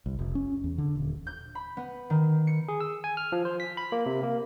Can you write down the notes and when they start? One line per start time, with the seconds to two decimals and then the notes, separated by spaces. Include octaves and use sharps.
0.06 C2
0.19 F1
0.35 C#4
0.64 E2
0.78 D3
0.95 D#1
1.27 G6
1.55 B5
1.77 B3
2.10 D#3
2.47 C#7
2.68 G#4
2.81 E6
3.04 G#5
3.17 F6
3.32 F3
3.45 C5
3.60 B6
3.77 B5
3.92 A#3
4.06 C3
4.23 A#3